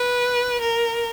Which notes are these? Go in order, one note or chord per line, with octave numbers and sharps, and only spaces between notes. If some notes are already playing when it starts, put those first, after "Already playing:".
Already playing: B4
A#4